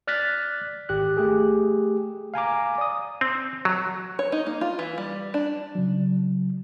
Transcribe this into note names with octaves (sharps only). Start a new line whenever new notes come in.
D5 F6 F#6 A6 B6
G#1 G4 F#6
A3 G4 G#4
F5 G#5 A#5 D6
D5 D#6
C4
F#3
C#5
D#4
A#3
F4
E3
G3
D4
C#3 F#3